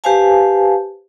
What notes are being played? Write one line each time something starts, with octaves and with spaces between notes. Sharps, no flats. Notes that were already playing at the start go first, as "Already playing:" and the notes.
G4 B4 C5 F5 G#5 A5